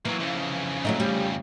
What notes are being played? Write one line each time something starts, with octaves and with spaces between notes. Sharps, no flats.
A#2 E3 F#3
F2 C#3
F#3 A3 D#4
G3